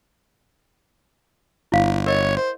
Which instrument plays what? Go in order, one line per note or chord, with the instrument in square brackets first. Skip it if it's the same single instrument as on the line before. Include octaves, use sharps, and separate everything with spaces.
[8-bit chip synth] G1 [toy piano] E4 F5
[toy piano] A#4 D#5 [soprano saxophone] C#5
[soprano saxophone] C5